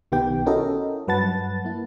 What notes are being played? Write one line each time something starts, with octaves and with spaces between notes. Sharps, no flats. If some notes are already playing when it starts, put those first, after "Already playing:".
B1 D#3 B3 G4 G5
C#4 E4 F#4 A4 A#4 D#5
G2 F#3 B4 F#5 A5 A6
A#3 E4